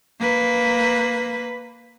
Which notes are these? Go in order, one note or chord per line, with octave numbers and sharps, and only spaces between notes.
A#3 B4